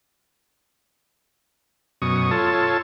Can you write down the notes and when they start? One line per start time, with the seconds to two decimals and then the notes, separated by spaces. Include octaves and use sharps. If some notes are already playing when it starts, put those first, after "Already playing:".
2.02 F#2 B2 C#6 D#6
2.31 F4 A4 C#5 A5